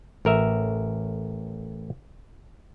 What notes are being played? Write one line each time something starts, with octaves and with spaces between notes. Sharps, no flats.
A1 A#4 E5